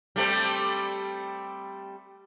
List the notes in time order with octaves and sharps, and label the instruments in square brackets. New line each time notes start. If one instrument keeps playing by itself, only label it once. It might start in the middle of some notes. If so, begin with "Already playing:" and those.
[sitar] G3 A3 C4